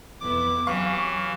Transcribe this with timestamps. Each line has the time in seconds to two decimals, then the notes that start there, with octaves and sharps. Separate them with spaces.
0.20 F2 B3 E4 D6
0.67 E3 F#3 C#4 G4 F5 C#6